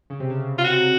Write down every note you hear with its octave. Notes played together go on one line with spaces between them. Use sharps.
C#3
C3
C#3
F4
F#4